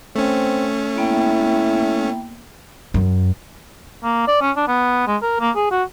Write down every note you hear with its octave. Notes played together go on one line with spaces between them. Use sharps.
A3 C4 C#4
A#3 B3 E4 G5
F#2
A#3
D5
C#4
D4
B3
G#3
A#4
A#3
G#4
F#4